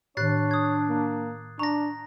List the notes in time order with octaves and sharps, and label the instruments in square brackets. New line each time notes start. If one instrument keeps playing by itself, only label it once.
[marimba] A2 D#3 [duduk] D4 [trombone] C#5 [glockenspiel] F#6 A6 C7
[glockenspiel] D#6 G#6
[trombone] A#3
[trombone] D4 [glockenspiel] A#5 A#6 [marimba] C#6